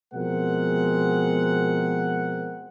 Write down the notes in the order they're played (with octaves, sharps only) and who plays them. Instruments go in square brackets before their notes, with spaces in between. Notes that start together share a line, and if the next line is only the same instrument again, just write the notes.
[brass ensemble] B2 F3 G#3 C4 A#4 F#5